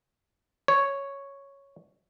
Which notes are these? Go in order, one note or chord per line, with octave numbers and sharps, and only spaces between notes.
C#5